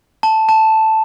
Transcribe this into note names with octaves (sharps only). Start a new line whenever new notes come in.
A5
A5